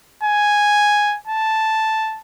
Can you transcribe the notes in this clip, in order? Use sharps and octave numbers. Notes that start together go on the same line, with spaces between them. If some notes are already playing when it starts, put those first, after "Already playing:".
G#5
A5